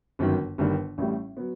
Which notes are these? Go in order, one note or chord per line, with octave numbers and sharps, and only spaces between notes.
G1 F#2 D#3
G1 G2 D#3 G3
A1 A2 G3
F#3 B3